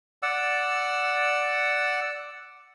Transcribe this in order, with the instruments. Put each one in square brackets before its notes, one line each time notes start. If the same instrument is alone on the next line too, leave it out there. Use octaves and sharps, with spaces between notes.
[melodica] D5 F#5 E6